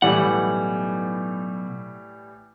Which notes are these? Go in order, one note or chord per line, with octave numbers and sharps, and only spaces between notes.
B1 A2 E3 G3 F#5